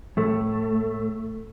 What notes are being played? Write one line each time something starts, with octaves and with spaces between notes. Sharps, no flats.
A2 A3